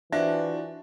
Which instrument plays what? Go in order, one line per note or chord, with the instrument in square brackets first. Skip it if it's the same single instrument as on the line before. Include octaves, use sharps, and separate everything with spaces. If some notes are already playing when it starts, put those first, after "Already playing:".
[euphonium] E3 [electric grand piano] D4 [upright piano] F4 F#4 C5 [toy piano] E5